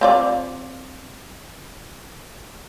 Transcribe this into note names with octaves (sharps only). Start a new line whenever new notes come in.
C4 F4 D5